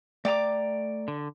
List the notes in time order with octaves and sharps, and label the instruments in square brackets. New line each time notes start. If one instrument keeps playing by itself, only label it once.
[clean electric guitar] A3 G5 A#5 [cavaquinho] D5 D6
[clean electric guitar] D3